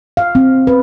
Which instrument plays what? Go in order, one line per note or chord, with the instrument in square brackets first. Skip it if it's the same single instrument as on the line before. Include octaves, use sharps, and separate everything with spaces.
[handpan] F5
C4
B4